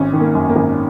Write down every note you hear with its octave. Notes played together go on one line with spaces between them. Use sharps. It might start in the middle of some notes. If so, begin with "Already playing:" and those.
Already playing: G#1 C#4
D#3
A#3
F#2
A#3
G#1